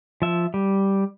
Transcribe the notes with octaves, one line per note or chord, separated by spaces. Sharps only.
F3 E5
G3